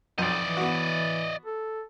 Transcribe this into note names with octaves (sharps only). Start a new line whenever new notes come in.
B1 F2 D5 D#5
E3
B3 F#4
A4